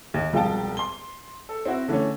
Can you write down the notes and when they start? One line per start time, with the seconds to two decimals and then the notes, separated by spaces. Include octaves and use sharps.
0.14 D#2
0.33 E1 C2 F3 F5 G5 A5
0.77 C6 G7
1.49 A4
1.66 C4 E4 F#4
1.88 D3 E3 A3 C#4